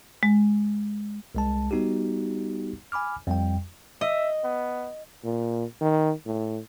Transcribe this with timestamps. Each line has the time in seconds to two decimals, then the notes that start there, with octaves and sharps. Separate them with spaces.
0.23 G#3
1.35 C2 G#3 A5
1.71 G3 B3 D#4 F#4 G4
2.92 G#5 B5 D6 F6
3.27 F2 G3 G5
4.01 D#5 E5
4.44 B3
5.24 A#2
5.81 D#3
6.26 A2